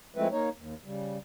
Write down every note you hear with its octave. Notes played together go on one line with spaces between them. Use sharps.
F3 G#3 A3 C4 E4 B4
A#3 D#4 C#5
D#2
C#3 G3